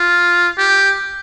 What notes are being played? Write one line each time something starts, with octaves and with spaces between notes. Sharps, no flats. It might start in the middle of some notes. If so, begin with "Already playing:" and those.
Already playing: F4
G4